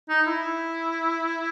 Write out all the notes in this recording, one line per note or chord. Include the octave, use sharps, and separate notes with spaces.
D#4
E4